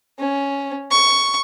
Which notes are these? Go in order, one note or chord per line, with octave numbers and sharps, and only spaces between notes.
C#4
C#6